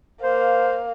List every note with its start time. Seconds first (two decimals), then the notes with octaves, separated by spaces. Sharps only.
0.23 A#3 C5 F5